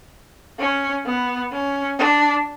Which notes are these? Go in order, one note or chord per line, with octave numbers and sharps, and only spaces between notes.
C#4
B3
C#4
D4